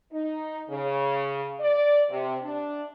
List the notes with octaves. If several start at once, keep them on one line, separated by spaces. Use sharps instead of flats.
D#4
C#3
D5
C3
D4